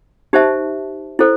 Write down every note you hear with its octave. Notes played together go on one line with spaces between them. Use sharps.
D#4 G4 C5 E5 A5
E4 A4 C5